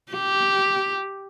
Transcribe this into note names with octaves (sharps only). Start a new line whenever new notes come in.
G4